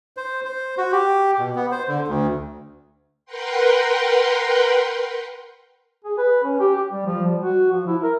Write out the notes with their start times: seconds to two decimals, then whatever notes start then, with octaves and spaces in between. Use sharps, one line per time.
0.17 C5
0.45 C5
0.78 F#4
0.92 G4
1.39 B2
1.55 B3
1.72 C5
1.88 D3
2.08 D2
3.26 A#4 B4 F#5 G5 C6
6.04 G#4
6.18 B4
6.44 C#4
6.60 G4
6.76 G4
6.92 G3
7.06 F3
7.27 G3
7.42 F#4
7.72 F3
7.87 E4
8.03 A#4